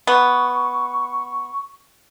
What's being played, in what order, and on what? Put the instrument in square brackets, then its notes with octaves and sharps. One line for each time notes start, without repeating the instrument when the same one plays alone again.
[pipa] B3 [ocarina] C#6